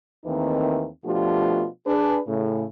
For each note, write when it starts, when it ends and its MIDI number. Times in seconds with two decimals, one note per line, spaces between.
0.25 0.87 39
0.25 0.87 51
0.25 0.87 52
0.25 0.87 57
0.25 0.87 60
0.25 0.87 63
1.04 1.66 47
1.04 1.66 53
1.04 1.66 57
1.04 1.66 62
1.04 1.66 65
1.04 1.66 67
1.87 2.19 62
1.87 2.19 68
1.87 2.19 71
2.27 2.64 45
2.27 2.64 49